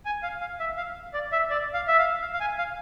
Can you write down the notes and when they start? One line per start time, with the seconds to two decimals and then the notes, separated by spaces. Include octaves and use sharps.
0.05 G#5
0.23 F5
0.41 F5
0.60 E5
0.77 F5
1.14 D5
1.32 E5
1.50 D5
1.74 F5
1.87 E5
1.98 F5
2.21 F5
2.33 F5
2.40 G#5
2.58 F5